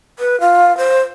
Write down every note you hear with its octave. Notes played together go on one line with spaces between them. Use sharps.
B4
F4
C5